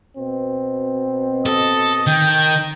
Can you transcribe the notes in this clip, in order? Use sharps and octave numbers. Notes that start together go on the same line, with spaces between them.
B2 C4
A4 D#5
D#3 G5